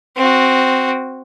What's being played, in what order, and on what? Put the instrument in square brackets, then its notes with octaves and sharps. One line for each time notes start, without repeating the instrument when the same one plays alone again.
[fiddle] C4 F#4